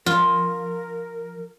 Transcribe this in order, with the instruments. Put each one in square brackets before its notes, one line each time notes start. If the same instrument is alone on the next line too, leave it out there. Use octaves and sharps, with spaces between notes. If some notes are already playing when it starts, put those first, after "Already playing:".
[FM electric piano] F3 [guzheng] F4 [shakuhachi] A#4